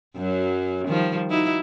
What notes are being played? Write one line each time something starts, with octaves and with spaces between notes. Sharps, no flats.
F#2 F#3
D#3 F3 G3
D#4 E4 F#4